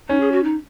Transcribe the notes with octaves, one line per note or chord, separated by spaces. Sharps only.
C#4 D#4
G#4
F#4
D#4